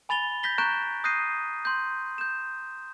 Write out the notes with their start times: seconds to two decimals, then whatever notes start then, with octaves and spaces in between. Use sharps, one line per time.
0.09 G#5 B5 A6 F7 G7
0.43 G6 A#6 B6 G7
0.58 A#5 C#6 F#6 G6 D7 E7
1.04 D#6 F#6 G6 A#6 C7 D#7
1.65 C6 G6
2.18 G6 E7